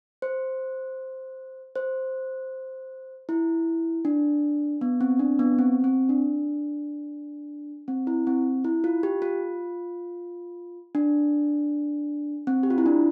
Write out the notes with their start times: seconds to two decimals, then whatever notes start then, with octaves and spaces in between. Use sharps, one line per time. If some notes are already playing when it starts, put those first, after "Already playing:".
0.22 C5
1.76 C5
3.29 E4
4.05 D4
4.81 B3
5.01 C4
5.19 D4
5.39 B3
5.59 C4
5.84 C4
6.09 D4
7.88 C4
8.07 E4
8.27 C4
8.65 E4
8.84 F4
9.03 G4
9.22 F4
10.95 D4
12.47 C4
12.63 G4
12.70 F4
12.78 E4
12.86 D4